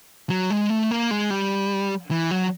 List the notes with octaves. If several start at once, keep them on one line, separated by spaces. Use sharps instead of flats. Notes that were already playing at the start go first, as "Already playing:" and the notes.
F#3
G#3
A3
A#3
G#3
G3
E3
F#3